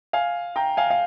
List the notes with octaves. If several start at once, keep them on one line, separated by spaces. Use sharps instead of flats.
F5 G#5
G5 A#5
F5 G#5
F5